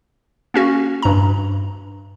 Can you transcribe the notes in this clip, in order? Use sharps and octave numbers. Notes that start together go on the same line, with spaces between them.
A#3 C#4 F#4
G2 A#5